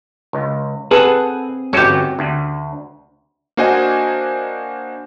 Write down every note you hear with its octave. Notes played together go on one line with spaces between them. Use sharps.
C#2
C4 G#4 A4 B4 F#5
G1 F#3 C#4 F#4 G4
D2
A#3 D4 F#4 C5 D#5 G#5